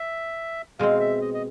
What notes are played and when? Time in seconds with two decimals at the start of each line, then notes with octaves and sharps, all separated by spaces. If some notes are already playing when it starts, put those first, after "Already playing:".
Already playing: E5
0.79 B2 G#3 C4 F5
1.00 E5
1.21 D#5
1.34 D#5